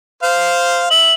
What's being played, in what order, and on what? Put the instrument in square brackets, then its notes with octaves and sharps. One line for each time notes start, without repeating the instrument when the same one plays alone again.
[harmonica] C5 F5
[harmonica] E5 [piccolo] F#7